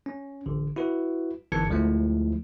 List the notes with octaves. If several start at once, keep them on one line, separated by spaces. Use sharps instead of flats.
C#4
A1 D3
E4 F#4 B4
G1 E3 B4 A5 G#6 C#7
D2 F3 G#3 A3 E4